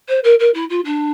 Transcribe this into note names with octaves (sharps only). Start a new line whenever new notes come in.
C5
A#4
A#4
E4
F4
D4